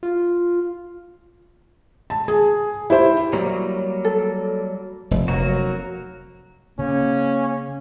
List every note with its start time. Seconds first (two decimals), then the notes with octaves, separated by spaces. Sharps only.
0.03 F4
2.10 A5
2.28 G#4
2.90 E4 G4 C5
3.33 F#3 G3 A#3
4.04 A4
5.11 F1
5.28 F#3 A#3 F#4
6.79 C#3 A#3 C#4